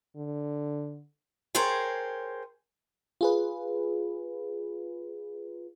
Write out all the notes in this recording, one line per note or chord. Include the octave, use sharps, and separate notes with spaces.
D3
G#4 A#4 C5 C#5 G5 A5
F4 G#4 B4